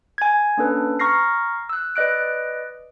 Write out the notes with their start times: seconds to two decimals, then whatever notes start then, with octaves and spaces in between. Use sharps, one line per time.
0.18 G#5 G#6
0.57 A#3 C#4 D4 A4 B4
0.99 A#5 C#6 F6 A#6 C7
1.69 E6 F#6
1.96 B4 D5 D#5 F#6 D7